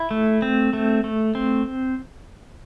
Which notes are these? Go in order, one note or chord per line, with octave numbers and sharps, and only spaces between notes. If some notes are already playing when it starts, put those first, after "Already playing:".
Already playing: E4
A3
C4
A3
A3
C4